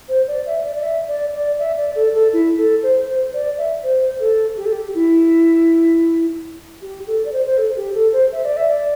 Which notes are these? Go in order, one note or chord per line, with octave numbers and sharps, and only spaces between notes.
C5
D5
E5
D5
D5
E5
D5
D5
E5
D5
A4
A4
E4
A4
C5
C5
D5
E5
C5
A4
G4
A4
G4
E4
G4
A4
D5
C5
C5
A4
G4
A4
C5
E5
D5
E5
D5